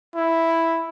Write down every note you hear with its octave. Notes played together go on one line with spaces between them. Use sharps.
E4